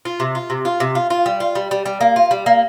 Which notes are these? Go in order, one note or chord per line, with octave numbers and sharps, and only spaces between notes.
F4
C3
F4
C3
F4
C3
F4
F4
G3
F4
G3
G3
G3
A#3
F4
G3
A#3